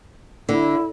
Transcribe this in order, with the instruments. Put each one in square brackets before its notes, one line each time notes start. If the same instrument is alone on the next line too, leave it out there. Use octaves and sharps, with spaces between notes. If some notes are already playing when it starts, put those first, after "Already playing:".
[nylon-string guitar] D3 [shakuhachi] E4